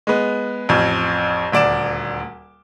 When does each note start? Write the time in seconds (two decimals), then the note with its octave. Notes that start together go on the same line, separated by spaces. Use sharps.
0.07 G#3 B3
0.69 A1 F2
1.52 D#1 D2 D5 D7 E7